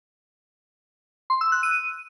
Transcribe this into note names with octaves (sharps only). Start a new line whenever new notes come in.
C6
E6
F#6
D#7